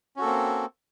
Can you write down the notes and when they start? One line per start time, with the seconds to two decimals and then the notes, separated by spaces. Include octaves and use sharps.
0.16 C#4
0.19 F#4
0.21 A4
0.24 A#3
0.26 C4